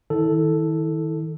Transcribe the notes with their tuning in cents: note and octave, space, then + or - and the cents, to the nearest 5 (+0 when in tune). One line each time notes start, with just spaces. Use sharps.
D#3 +15 E4 -30 A4 +0